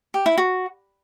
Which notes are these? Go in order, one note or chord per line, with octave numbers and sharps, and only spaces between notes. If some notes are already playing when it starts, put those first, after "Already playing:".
G4
E4
F#4